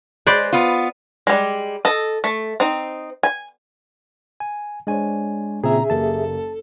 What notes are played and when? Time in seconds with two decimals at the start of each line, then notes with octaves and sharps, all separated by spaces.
0.27 G#3 B4 C5 D5
0.53 B3 F4
1.27 G3 G#3
1.85 A4 D#5
2.24 A3
2.60 C4 D#4
3.23 G#5
4.40 G#5
4.87 G#3 D4 C5 C#5 G#5
5.64 A#2 C#3 C4 G#4 E5 A#5
5.90 F#1 A#3 G4 A4 A5